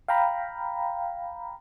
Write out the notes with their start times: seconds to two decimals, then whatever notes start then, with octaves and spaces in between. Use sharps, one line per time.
0.08 F5 G5 A#5 B5